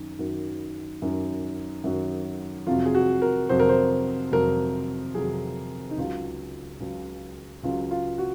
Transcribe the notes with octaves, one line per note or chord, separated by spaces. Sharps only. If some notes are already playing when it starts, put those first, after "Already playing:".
Already playing: F#2 D#3
F#2 D#3 F#3
F#2 D#3 F#3
F#2 D#3 F#3
F2 C3 F#3 F4
G#4
F#4
A#4
F2 C3 F#3 C5
A#4
C5
F2 C3 F#3 A#4
F2 C3 F#3 G#4
D#4
C#2 C#3 F#3 F4
C#2 C#3 F#3
C#2 C#3 F#3 F4
F4
F#4